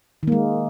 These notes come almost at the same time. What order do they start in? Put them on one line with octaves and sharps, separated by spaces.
D#3 A#3 G#3